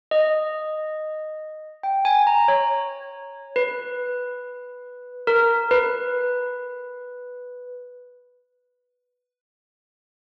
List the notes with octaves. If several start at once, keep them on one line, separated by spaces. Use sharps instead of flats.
D#5
G5
G#5
A#5
C#5
B4
A#4
B4